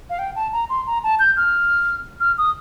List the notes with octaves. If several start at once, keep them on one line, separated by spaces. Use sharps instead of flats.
F5
G5
A5
A#5
C6
A#5
A5
G6
F6
F6
D#6